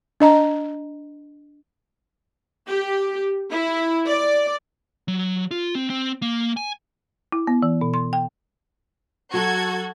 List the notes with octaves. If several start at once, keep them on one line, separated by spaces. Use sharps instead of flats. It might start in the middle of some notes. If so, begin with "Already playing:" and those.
D4 D#5 A#5
G4
E4
D5
F#3
F4
C4
C4
A#3
G#5
E4
B3
E3
B2
C6
G5
F#3 F#4 A4 G#6